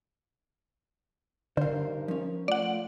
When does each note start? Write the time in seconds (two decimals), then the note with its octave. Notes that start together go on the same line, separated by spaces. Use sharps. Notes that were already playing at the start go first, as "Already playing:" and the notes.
1.57 G2 D3 D#4 A#4 C5 F5
2.08 F3 C#4
2.48 A3 F4 D5 F#5